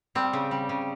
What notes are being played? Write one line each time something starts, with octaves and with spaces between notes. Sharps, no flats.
G3 C4
C#3
G3
C#3